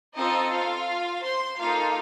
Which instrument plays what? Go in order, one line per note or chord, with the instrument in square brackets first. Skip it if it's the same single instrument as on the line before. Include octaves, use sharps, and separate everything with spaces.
[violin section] C4 D#4 F4 A4 D#5
F4 F5
C5 C6
A#3 D#4 F4 A4 F5